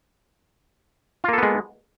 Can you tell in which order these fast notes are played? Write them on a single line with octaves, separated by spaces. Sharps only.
F4 A#3 A4 B3 G#3